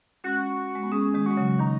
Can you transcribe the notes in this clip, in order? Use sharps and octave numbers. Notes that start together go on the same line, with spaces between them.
G#3 C#4 F#4
G#3
B3
G#3 C#4 G#4
D#3 G#3
G#3 F#4
C#3 F#3
D#3 D#4